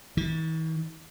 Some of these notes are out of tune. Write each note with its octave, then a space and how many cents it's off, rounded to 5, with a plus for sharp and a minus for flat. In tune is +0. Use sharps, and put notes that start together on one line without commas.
E3 -45